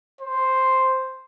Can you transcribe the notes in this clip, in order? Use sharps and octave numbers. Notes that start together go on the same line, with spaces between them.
C5